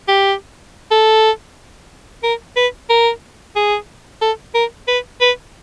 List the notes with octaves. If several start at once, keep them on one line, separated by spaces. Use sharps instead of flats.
G4
A4
A#4
B4
A#4
G#4
A4
A#4
B4
B4